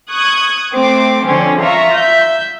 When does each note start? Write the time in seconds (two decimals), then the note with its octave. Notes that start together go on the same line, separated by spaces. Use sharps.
0.10 C#6 D#6 F#6 G#6
0.74 A3 C4 D6
1.24 D3 F3 C4 C#4
1.61 F4 E5 A#5 C#6
1.94 E5 G6